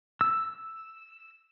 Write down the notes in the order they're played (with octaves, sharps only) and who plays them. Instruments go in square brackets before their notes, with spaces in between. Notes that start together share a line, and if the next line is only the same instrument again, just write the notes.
[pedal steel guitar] E6